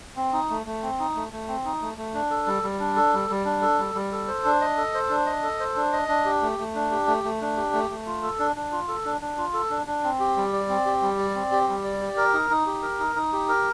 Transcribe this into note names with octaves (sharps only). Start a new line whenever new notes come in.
C4
D#4
A3
A3
C4
D#4
A3
A3
C4
D#4
A3
A3
D4
A4
G3
G3
D4
A4
G3
G3
D4
A4
G3
G3
A4
C5
D4
D#5
A4
C5
D4
D#5
A4
C5
D4
D#5
D4
G4
A3
A3
D4
G4
A3
A3
D4
G4
A3
A3
F4
A4
D4
D4
F4
A4
D4
D4
F4
A4
D4
D4
C4
G4
G3
D5
C4
G4
G3
D5
C4
G4
G3
D5
G4
A#4
D#4
D#4
G4
A#4
D#4
D#4
G4
A#4